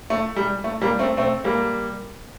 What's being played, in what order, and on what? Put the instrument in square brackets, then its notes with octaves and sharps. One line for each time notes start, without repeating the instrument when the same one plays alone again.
[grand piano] A3
G3
A3
G3 A#3
A3 C4
A3 C4
G3 A#3